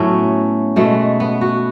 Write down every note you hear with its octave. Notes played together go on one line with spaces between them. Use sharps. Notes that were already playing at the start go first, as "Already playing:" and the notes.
Already playing: A2 F#3 A3 B3 C#4
B2 G#3 A3
B3
F#4